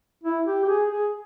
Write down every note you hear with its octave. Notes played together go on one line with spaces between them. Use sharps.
E4
G4
G4
G#4
G#4